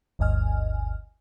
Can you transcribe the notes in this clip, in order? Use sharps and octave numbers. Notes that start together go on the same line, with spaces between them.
G1 D2 G2 D#5 G#5 F6